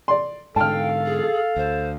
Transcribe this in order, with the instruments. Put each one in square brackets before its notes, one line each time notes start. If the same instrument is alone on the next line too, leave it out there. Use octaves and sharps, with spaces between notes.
[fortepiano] D5 C6
[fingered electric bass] G#2 D3 [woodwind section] A4 F5 [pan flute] G5 [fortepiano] A5 F6
[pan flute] G#4
[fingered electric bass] D2 [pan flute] C5